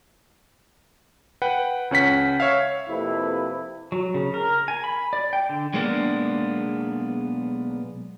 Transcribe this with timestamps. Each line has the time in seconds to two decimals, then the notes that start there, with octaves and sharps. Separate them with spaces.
1.42 B4 F#5 G5
1.91 C#2 C#4 F#5 B6
2.40 C#5 E5 F5
2.89 F2 C3 A#3 E4 A4 B4
3.92 F#3
4.14 C#3
4.34 A#4
4.68 G#5
4.84 B5
5.13 D5
5.33 G5
5.49 D3
5.74 B1 G#3 A#3 B3 D4